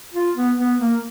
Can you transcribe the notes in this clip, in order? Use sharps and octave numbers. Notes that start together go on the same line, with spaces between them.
F4
B3
B3
A#3